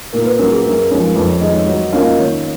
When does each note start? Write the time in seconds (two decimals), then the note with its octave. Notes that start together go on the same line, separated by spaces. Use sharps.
0.13 A#2 A#4
0.26 B4
0.39 F#3 C#4 A#4
0.52 G#4
0.64 F#2 A#4
0.73 G#4
0.82 A#4
0.91 F3 G#3 C#4
1.10 A#4
1.16 F2 B4
1.28 C#5
1.41 D#3 G#3 D#5
1.54 C#5
1.67 F#3
1.93 A#3 C#4 F4 F5
2.06 D#5
2.18 D#3 C#5